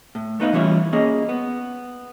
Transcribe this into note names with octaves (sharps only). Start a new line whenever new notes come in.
A2
A3 B3 D#4 B4 D5 F5
E3 G3 C#4 E4 F4
A#3 C#4 G#4 D#5
B3